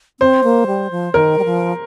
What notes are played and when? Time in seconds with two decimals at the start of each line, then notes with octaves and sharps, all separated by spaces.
0.20 C4 C5
0.43 A#3
0.67 G3
0.91 F3
1.13 D#3 A#4
1.38 G3
1.45 F3